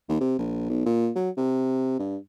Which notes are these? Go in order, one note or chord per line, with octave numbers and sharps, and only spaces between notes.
D#2
C3
A#1
B1
A#2
F#3
C3
G2